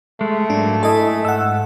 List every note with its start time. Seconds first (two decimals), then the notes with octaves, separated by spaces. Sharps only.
0.21 G#3 A3
0.50 G#2 F#3 A#3 D4
0.83 E4 A4 D#5 G#5
1.25 G#2 F#5 E6